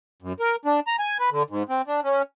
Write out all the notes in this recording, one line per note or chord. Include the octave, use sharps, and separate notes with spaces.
F#2
A#4
D4
A#5
G#5
B4
D3
G#2
C4
D4
C#4